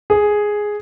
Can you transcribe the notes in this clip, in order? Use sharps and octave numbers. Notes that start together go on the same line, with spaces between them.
G#4